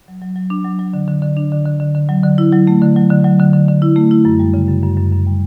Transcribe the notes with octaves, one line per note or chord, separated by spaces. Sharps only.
F#3
F#3
F#3
D4
F#3
F#3
D3
D3
D3
D4
D3
D3
D3
D3
F#3
D3
E4
F#3
A3
D3
F#3
D3
F#3
D3
D3
D3
E4
A3
E4
F#2
G3
C#3
F#2
F#2
F#2
F#2
G3